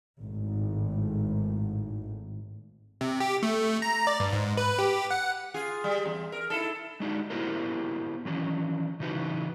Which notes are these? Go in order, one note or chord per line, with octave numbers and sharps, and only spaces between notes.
G#1 A2
C3
G4
A3
A#5
D5
G2
G#2
B4
G4
F#5
F4 G#4
G3
E2
A#4
D#4 E4 A4
G#3 D4 D#4 F#4
B3 E4 F#4 G4 A#4 C5
D#3 E3 F#3 C#4
C#3 E3 D#4 F#4 B4